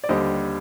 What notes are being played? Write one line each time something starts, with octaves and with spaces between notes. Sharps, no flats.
D5
D#2 D3 G3 C5 D#5